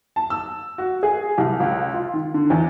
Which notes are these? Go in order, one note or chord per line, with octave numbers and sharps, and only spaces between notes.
A5
E6
F#4
G#4
C2
C#2
F4
D#3
D3
E2